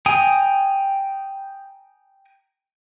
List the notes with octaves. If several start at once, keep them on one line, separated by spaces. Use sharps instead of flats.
G5 G#5 A#5 D#6